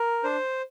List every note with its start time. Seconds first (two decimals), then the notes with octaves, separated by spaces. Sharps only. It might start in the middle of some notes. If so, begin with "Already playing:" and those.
Already playing: A#4
0.24 D4 C5